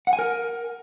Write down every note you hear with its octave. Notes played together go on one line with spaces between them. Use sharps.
F#5
G#5
A#4